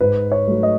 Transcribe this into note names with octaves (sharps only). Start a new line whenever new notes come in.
G#2 B4
C#5
F#3 A3
D#5